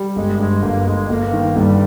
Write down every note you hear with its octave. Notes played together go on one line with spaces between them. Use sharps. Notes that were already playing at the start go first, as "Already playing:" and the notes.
Already playing: G3
G1 G#3
G2 G#3
G1 A#3
G1 G#3
G1 A#3
D#3
G1 G3